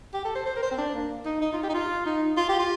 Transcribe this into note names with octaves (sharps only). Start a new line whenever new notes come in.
G4
A4
C5
C5
A#4
C5
C4
D4
A#3
D#4
D#4
F4
G4
D#4
F4
D#4
F4
G4
F4